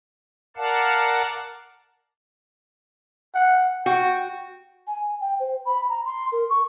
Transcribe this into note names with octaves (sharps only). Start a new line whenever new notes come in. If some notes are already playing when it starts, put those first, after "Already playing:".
A#4 D5 F5 F#5 A5
F#5
F#4 G5
G#5
G5
C5
B5
A#5
C6
A#4
C#6